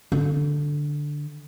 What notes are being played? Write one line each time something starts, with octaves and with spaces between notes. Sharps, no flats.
D3